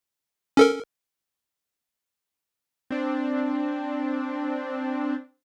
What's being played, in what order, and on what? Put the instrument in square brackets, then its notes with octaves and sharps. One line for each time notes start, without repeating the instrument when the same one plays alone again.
[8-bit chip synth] C#4 A4 A#4
[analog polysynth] C4 D4